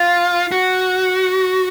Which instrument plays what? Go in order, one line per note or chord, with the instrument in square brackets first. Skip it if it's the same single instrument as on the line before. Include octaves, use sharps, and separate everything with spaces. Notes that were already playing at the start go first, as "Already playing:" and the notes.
Already playing: [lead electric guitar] F4
F#4